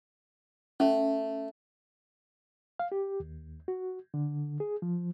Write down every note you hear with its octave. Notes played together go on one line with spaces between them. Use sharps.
A3 C#4
F5
G4
D#2
F#4
D3
G#4
F3